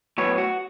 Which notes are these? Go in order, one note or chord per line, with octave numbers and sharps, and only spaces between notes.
A2 F#3 B3 C#5
F#4